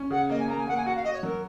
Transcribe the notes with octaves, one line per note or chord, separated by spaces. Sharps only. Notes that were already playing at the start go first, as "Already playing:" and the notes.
Already playing: C#4
C#3 F#5
A#3 D#5
G#5
A#3 A#5
G#5
A#3 F#5
G#5
F#4 F#5
F5
F#4 D#5
C#5
F#3 A#4